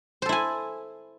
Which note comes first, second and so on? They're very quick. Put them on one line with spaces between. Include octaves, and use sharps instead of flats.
C5 A4 E4 G#5